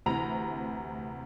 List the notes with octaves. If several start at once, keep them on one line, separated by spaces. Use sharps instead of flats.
D2 C3 E3 A#5 B5 F7